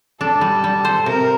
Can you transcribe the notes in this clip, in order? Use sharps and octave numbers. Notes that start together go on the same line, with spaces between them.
D4 A4
G3
G3
C5
C3 A#4